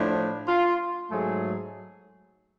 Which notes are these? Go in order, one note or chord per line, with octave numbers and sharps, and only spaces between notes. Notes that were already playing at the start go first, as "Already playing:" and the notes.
Already playing: A2 F3 A3 D4
F4
G#2 F#3 A3 G#4